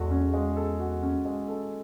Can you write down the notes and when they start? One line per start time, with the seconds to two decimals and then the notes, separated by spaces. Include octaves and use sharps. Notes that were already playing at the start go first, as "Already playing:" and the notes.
Already playing: E2 G#3 F#4 A4
0.11 C#4
0.33 G#3
0.57 A4
0.80 F#4
1.03 C#4
1.25 G#3
1.48 A4